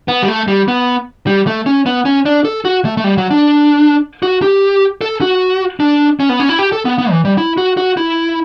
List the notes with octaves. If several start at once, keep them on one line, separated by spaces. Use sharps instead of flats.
B3
G3
A3
G3
B3
G3
A3
C#4
B3
C#4
D4
A4
F#4
A3
A3
G3
F#3
D4
F#4
G4
A4
F#4
D4
C#4
B3
C#4
E4
G4
A4
B3
B3
E3
G3
E4
F#4
F#4
E4